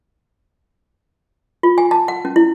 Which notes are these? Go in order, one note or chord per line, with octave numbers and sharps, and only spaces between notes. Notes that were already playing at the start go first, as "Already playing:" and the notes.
F4
G#5
A5
F#5
C#4
E4